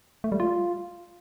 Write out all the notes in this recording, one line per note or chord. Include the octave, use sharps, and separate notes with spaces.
A3
G3
F4